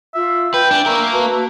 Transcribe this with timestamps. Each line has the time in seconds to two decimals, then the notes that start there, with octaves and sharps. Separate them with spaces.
0.14 F4 E5
0.54 B4 G5
0.71 D4 G#5
0.86 A#3 A#4 E5 C#6
1.11 F#4 B4 A5